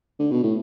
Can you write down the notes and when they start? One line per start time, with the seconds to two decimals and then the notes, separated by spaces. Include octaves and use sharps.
0.19 D3
0.31 B2
0.43 A2